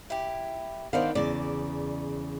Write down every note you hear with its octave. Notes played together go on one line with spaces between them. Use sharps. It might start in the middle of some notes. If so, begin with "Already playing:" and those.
E4 G4
D#3 B3 D4 C5 D5 F5
E2 C#3 D5